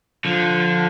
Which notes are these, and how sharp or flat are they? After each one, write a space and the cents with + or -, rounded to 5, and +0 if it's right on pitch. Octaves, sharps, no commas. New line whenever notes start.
D3 +0 F3 +10